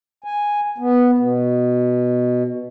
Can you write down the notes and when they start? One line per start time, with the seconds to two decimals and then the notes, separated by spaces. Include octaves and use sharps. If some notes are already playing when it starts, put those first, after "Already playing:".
0.24 G#5
0.78 B3
1.18 B2